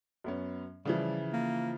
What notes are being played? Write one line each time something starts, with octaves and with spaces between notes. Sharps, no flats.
F#2 B3 C#4
C#3 E3 F3 G3
A#3